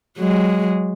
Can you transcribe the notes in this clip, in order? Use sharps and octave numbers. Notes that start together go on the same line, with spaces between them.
F#3 G#3